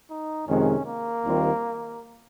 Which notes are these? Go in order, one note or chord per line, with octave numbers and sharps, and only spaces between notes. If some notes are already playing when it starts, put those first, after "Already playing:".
D#4
F2 C3 D#3 G#3 C#4
A#3
D#2 D#3 G3 C4 F4